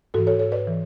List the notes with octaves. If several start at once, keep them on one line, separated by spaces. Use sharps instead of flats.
G#2 E3 F#4 A4
A4 C#5
A4 C#5
B4 D5
E3